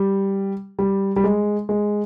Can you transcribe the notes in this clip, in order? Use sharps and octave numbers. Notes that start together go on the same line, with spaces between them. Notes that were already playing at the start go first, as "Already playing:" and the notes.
Already playing: G3
G3
G3
G#3
G#3